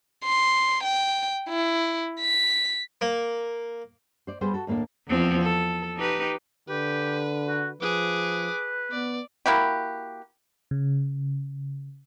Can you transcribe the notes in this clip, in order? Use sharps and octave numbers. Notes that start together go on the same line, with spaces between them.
C6
G5
E4
B6
A#3
C5 D5
G3 B3 G4 G#4 B4 C5
F#4 A4
D#2 A2 A#3 D4 A4
E2 F3 C4
A4
D#4 G4 B4
D3 G4 B4
F#4
F3 G#4 B4 D6
B3 D5
A#3 E4 F#4 G4
C#3